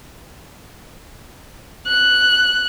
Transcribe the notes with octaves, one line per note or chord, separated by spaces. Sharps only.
F#6